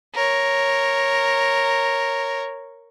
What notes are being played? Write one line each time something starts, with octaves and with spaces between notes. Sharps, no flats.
A#4 C#5